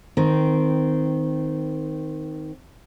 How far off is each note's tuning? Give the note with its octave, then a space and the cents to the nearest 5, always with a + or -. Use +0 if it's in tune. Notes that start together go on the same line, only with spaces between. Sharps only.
D#3 +0 C4 -20